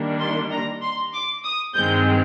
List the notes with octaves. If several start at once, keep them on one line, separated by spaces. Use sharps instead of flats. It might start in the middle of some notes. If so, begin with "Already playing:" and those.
Already playing: D#3 G3 A#3 D4
C6
A#5
C6
D6
D#6
G2 D#3 G#3 C4 G6